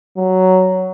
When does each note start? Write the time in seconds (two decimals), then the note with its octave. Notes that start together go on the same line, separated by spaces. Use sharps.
0.17 F#3